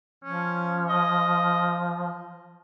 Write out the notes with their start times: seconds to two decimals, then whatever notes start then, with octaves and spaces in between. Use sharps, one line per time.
0.24 F3 C#4
0.89 D#5